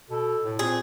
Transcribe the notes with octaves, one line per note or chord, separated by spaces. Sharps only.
B2 A4
A2
A#2 C4 G#4